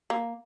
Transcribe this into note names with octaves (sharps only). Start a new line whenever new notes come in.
A#3